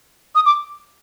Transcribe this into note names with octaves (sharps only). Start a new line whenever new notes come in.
D#6
D6